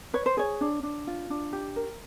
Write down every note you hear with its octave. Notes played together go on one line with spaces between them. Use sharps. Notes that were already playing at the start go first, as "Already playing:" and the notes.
B4 C#5
C5
G#4 C#5
D4
D4
F4
D4
G4
A#4